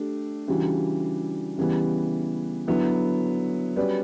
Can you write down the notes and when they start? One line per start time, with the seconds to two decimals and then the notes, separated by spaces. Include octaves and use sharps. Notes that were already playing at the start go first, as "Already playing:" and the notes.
Already playing: A3 D4 G4
0.48 C#3 E3 G3 D4 F#4
1.58 C#3 E3 G3 B3
2.67 D3 F#3 B3 E4
3.76 G3 C#4 F#4 B4 D5